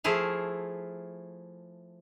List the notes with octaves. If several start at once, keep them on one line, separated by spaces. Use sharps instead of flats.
F3 A3 E4 G#4 F5